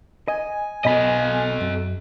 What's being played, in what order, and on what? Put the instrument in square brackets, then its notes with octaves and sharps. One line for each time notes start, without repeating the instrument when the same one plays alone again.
[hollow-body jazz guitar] D#5 [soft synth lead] G#5
[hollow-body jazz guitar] B1 B2 B5 [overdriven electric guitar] A4 D#5
[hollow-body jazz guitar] F#2